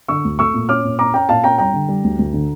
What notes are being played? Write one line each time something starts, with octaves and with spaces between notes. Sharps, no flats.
D3 C#6 E6
D2
A3 C#6 E6
A#2
C#4 D6 F6
A#2
C#4 A#5 D6
C#4 G5 A#5
A#2 F5 A5
C#4 G5 A#5
G3 G5 A#5
D3
G3
D2
D2
D3